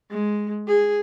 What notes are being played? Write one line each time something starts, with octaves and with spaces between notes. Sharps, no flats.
G#3
G#4